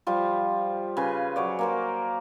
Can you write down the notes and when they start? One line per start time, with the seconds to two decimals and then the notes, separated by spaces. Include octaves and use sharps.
0.07 F3 G3 F4
0.97 C#3 B4 G#5
1.36 F#3 C#5 D5
1.59 A#3 A#4 C5